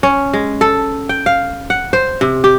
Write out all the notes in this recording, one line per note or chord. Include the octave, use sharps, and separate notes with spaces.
C#4
G#3
A4
G5
F5
F#5
C5
C3
G4